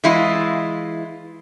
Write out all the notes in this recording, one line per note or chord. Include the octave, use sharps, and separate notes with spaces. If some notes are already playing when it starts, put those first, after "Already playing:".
E3 G#3 E4 F4